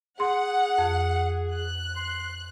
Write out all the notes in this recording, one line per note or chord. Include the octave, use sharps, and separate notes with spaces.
G#4 F#5 C6
F2
F#6
C6